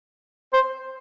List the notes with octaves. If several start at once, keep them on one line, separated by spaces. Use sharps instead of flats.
C5